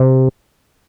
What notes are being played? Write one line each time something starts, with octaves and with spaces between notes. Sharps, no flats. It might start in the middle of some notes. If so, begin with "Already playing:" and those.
Already playing: C3